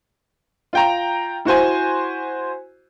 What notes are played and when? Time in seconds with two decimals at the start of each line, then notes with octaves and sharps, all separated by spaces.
0.73 F4 G5 A#5
1.45 E4 F#4 C5 G#5